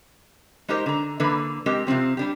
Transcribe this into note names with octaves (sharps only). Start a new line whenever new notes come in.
G#3 D#4 G4 A#4 C5
D3 A#5
D3 E3 A#3 B4
G#3 C4 G4 A#4
C3 F3 C4 G4
G3 D4 G4